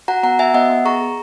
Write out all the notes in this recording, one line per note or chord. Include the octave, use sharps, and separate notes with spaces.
F#4 F#5 A#5
B3 F#5 A#5
F#4 E5 G#5
B3 D#5 F#5
B3
G#4 A#5 C#6
G#4